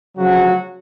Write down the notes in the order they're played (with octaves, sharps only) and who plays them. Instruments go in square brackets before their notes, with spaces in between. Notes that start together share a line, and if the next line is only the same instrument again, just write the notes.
[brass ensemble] D2 C#3 F3 F#3 F#4